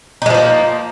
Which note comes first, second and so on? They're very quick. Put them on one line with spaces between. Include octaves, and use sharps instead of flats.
D#4 G#3 F3 A#3